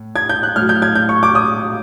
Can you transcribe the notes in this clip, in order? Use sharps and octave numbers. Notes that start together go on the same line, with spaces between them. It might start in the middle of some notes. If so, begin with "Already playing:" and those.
Already playing: A2
G#6
G6
F#6
A2 F#3 F6
G6
G#6
G6
C#6
D6
D#6